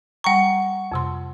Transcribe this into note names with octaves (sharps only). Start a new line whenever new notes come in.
G3 F#5 G5 A#5 C#6
F2 C3 C6